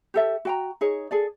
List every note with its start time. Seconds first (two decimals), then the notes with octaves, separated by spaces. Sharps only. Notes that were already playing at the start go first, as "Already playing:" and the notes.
0.14 G4 A4 E5
0.45 F#4 G5 A#5
0.81 D#4 G#4 C#5
1.11 G#4 A4 D5